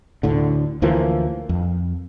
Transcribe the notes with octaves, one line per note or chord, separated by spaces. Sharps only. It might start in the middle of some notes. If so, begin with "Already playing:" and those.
D2 A2 D3
D2 E3 F3 A#3
F2